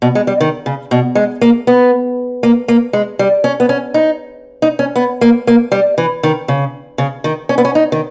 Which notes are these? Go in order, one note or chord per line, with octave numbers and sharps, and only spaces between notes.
B2
G#3
G3
D#3
C#3
B2
G#3
A#3
B3
A#3
A#3
G#3
G3
C#4
B3
C#4
D#4
D#4
C#4
B3
A#3
A#3
G3
E3
D#3
C#3
C#3
D#3
C#4
B3
C#4
D#4
D#3